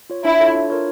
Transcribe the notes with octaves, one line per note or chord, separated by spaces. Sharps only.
F4 C#5
D4 E4
F4 A4 C#5 E5
D4
F4 A#4 C#5